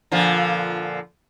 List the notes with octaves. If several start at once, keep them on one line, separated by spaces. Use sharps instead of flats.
A#2 D3 F3